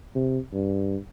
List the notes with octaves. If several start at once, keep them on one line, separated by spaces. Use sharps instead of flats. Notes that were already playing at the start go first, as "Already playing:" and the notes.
C3
G2